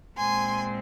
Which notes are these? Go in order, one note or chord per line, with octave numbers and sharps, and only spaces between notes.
A#2 G#3 C4 G#5 C6